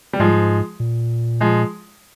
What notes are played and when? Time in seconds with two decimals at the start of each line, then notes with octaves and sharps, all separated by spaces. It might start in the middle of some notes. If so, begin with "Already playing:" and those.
0.13 G3
0.19 G#2 F3 G#3
0.80 A#2
1.41 F3 G#3